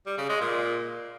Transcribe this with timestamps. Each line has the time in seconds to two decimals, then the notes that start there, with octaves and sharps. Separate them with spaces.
0.06 G3
0.18 C#3
0.29 G#3
0.41 A#2